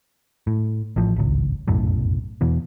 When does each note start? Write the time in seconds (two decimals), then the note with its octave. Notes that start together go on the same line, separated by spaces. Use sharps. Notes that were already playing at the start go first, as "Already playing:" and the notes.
0.47 A2
0.96 A1 A2 F3
1.16 D1 G#1 C#2
1.68 F1 B1 F#2 A2
2.41 E2 B2 E3